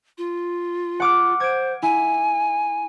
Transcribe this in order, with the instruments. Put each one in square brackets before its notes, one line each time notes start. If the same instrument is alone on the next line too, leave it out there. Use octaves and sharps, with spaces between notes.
[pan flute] F4
[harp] F#5 D6 F6
[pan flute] C5 [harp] G#6 D7
[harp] E4 [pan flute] G#5